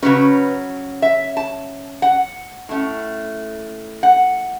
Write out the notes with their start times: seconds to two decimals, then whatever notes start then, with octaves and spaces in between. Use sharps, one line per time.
0.02 C#3 F#3 C#4 B4
1.02 E5
1.37 A5
2.02 F#5
2.69 A2 A3 C#4
4.03 F#5